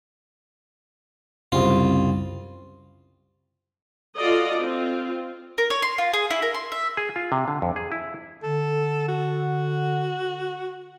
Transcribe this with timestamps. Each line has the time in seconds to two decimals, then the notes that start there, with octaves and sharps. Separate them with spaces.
1.52 C2 F#2 C#3 C4 F4
4.17 F4 F#4 A4 D5 D#5
4.60 C4 F4
5.58 A#4
5.70 C#5
5.82 C6
5.98 F4
6.14 G#4
6.31 E4
6.42 A#4
6.54 C6
6.72 E5
6.97 G#4
7.16 F4
7.32 C3
7.48 D3
7.62 F2
7.76 G#4
7.92 E4
8.43 D3 A4
9.09 F#4